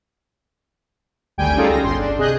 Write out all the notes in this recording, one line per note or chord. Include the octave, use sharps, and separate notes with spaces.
G#1 D2 G3 G5 G#5 D7
G3 C#4 D#4 F4 G#4 A4
C#2 A#6
G1 C6
D4
C3 G#4 D#5 F#6 G6